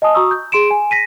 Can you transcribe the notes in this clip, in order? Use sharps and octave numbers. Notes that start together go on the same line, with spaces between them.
D#5 G#5 A5 D#6
F#4 A#5 C#6 D#6 E6
G6
G#4 C6 D7 E7
G#5
A#6 B6 D#7